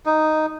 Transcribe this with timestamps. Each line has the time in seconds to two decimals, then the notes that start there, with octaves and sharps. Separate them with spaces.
0.06 D#4